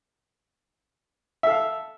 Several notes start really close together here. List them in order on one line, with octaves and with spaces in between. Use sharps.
E5 A4 F5